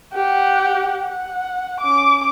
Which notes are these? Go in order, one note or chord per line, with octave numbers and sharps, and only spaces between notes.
G4 F#5
F#5
C#4 D6